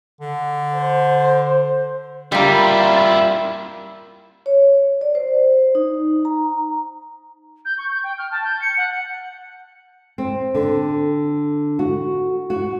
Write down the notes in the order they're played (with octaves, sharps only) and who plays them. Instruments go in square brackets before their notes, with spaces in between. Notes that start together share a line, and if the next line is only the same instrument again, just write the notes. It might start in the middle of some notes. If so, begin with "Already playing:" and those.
[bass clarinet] D3
[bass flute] C5
[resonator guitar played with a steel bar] G3 A#3 [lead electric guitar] E4 F4
[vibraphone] C#5
D5
C5
D#4
A#5
[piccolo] G6
C#6
G6
G5
F6
A5
G6
C#7
F#5
[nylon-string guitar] C4
D3
F#4
F#4